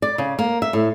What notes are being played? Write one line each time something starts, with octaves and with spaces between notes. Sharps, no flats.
D5
C#3
A#3
E5
A2